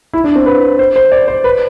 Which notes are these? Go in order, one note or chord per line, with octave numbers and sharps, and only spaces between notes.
E4
D4
C4
B4
C5
C5
D5
C5
B4